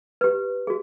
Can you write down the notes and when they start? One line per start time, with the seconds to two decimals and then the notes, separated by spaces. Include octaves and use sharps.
0.21 G4 B4
0.67 F#4 G#4